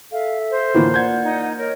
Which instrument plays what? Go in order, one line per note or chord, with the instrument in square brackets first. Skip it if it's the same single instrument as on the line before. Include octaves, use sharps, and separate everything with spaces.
[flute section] A4 E5 [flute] F5
[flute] C5
[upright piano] A2 D3 E3 [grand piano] A#3 F4
[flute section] D5 F#5 [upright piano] G6 G#6
[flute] D#4
[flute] A#4 [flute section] C#5 D#5